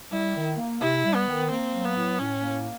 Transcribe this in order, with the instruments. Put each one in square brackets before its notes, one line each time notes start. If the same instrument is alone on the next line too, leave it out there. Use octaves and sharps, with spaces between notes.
[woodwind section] G3 [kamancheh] E4
[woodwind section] D#3
A#3
[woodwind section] C3 [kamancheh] E4
[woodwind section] G3
[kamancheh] B3
[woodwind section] D#3
[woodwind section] A#3 [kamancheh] C4
[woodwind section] F#3
[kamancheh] B3
[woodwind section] A2
[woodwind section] A2 [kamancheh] C#4
[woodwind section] A#3